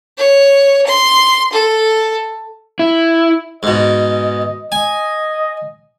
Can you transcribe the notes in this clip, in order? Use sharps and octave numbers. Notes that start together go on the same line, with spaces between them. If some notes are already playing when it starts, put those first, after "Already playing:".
C#5
C6
A4
E4
G#2 B2 D#5
D#5 G#5